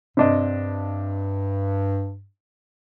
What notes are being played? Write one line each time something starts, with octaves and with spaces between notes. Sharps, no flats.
G2 C3 D4 D#5